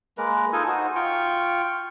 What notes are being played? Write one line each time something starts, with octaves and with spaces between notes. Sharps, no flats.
G#3 A#3 A#4 B4
D#4 F4 A4 G#5
D#4 F#4 C5
F4 G5 C#6